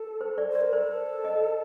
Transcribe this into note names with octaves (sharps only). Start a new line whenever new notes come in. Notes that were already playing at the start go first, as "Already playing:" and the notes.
Already playing: A4
C5
D5
C5
D5
A#4
A4 C5
D#5